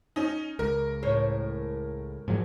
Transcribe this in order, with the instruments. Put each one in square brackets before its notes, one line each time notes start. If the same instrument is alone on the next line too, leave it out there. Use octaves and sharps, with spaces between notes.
[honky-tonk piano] C#4 D#4
[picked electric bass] C#2 [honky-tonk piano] A#4
[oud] A2 C5 C#5
[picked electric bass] G#2 F3 F#3